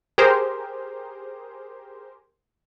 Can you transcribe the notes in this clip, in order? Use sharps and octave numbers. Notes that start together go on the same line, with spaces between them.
G4 G#4 A#4 C5